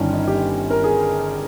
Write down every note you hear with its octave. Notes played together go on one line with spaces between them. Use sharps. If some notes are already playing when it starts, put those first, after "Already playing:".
Already playing: G1 G2 D#3 C#4
D#4
G4
A#4
G#4